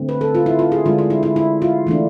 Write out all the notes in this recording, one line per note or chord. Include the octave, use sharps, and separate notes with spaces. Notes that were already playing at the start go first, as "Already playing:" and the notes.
Already playing: D3 A3 C4
B4
A4
F4
E4
F4
G#4
D3 G#3 D4 F4
F4
E4
E4
E4
F4
E3 A3 D4